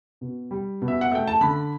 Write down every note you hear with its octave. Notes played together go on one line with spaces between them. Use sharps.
B2
G3
B2
E5
F#5
A3 G5
A5
D3 B5